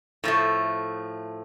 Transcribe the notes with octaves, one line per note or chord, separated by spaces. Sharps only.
A2 F3 A3